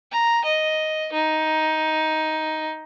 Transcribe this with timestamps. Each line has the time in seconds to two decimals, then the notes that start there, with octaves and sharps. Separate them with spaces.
0.12 A#5
0.45 D#5
1.13 D#4